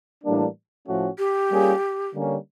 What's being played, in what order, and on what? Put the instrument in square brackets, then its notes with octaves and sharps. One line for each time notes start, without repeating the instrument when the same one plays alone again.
[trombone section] A2 E3 G3 A#3 D4
A2 F3 A3 C#4 F#4
[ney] G4
[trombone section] G3 A#3 C#4 F4 G#4
D3 G3 A#3 C#4